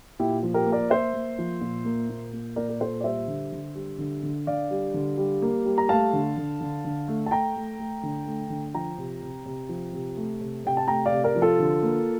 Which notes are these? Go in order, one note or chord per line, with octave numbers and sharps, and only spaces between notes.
A#2 E4 G4
F3
G4 A#4
A#3
A#4 D5
A#3 C5 E5
A#3
F3
A#2
A#3
A#2
A#3
A#2 A#4 D5
A#4
A#2 A4 C5
D5
G3 C5 E5
D3
D3
G3
D3
D3
D3 D5 F5
G3
D3
G3
A#3
G3
A#5
A3 F5 A5
D3
D3
D3
D3
A3
A5
A3 G5 A#5
A3
A3
D3
A3
D3
F3 G5 A#5
C3
C3
C3
F3
C3
A3
C3
C3 G5
A5
A3 G5 A#5
D5 F5
C3
A#4 D5
F3
F4 A4
D3
A#3